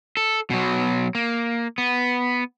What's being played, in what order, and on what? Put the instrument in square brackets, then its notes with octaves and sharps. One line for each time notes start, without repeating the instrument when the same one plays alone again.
[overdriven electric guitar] A4
B2 F#3
A#3
B3